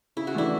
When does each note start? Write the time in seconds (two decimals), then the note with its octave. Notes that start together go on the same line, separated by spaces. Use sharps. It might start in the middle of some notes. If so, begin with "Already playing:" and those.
0.17 C#3 E4
0.27 F#4
0.34 E3 A3 D4 E4